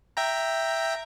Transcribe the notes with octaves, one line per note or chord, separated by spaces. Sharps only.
E5 G5 A#5